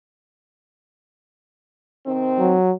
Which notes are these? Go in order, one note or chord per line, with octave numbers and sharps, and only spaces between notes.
C3 D#3 C4
F#3